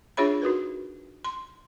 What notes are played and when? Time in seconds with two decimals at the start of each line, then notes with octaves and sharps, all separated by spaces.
0.17 D4 F4 G#4 C#5 E5 B5
0.42 D#4 F#4 A#4 B4
1.25 C6